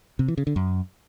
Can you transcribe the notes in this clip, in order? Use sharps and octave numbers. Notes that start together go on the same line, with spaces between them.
C3
E3
C#3
D3
F#2